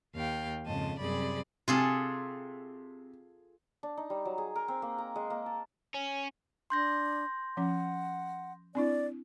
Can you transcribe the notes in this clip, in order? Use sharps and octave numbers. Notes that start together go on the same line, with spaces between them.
D#2 F5 G5
F2 G#2 C#3 D#5 A5
F#2 C3 G3 G#4 D5 B5
C3 F4 G#4 A4
D4
D#4
G3
F#3
G#4
A#4
C4
A#3
A#5
G#3
A#3
A5
C#4
D4 C6 G6 A#6
F3 C#4 F#5
C4 D4 E4 D5